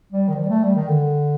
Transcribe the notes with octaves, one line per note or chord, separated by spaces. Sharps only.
G3
D#3
F3
G3
A3
G3
D#3
D3